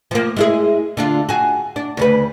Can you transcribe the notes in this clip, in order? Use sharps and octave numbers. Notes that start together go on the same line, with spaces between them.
F3 A#3
G#3 E4 G#4
D3 D4 F4
F#4 G#4
D4
D2 C#3 B4